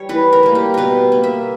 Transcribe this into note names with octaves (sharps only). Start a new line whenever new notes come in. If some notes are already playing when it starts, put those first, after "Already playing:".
Already playing: G3 C#5
E3 B4
A#4
G3 A#3
G4
B2 A#4 B4
A#3
E5